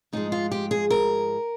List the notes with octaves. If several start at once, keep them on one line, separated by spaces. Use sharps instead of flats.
G#2 F3 G#3 D#4
F4
G4
G#4
A#4